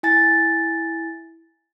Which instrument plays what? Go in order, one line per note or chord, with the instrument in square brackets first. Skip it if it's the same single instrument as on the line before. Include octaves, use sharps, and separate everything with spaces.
[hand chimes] E4 G#5 A6